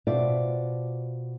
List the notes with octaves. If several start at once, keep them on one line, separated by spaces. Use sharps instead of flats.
B2 F4 C5 D5 E5